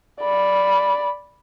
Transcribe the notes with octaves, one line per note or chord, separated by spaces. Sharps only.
D5 B5